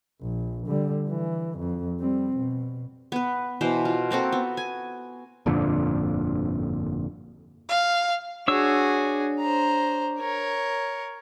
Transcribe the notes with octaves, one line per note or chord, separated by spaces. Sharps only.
A#1
D3 G3
E3
F2
G3 C4
B2
B3 B4
B2 E3 C5
F4
A#3 C4 F#4 A4
B3
G#5
G1 F2 A#2 D3
F5
D4 F#4 G#4 C#5 E6
C5 A#5
A#4 C#5